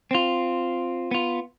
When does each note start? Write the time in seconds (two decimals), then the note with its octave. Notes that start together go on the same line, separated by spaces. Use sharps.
0.11 C4 F4
1.11 B3 F4